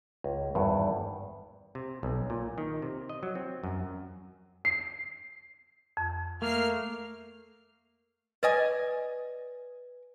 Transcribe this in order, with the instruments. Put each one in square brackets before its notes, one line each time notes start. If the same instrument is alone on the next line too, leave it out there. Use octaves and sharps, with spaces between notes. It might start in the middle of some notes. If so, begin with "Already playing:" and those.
[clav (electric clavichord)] C#2
G#1 E2 G2
C3
B1
A#2
D#3
C3
D#5
F#3
C4
F#2
[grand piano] C7
[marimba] F2
[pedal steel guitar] A3 [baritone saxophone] A#3 [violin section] F6 C7
[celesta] B4 [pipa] D5 D#5 G#5